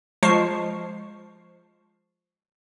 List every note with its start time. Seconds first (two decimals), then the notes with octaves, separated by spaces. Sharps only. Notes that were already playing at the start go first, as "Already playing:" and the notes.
0.23 F3 G#3 F4 A5 C#6 C7